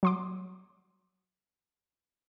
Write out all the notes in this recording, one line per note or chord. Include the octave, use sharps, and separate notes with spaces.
F#3 C6 D6